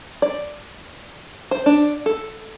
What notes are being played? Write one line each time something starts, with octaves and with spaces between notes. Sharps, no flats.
D5
C5
D4
A4